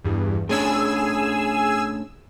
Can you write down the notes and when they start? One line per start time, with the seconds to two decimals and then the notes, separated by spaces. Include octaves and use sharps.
0.04 E2 G2
0.49 A2 C#4 D4 G#4 G#5 E6